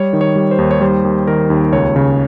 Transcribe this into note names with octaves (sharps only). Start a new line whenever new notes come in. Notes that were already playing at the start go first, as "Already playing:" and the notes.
Already playing: G3 C#5
D#3
C#5
G3
C5
D#2
C#5
G3 C5
D#2
D#3 A#4
D#2
C#2 C#5
C#3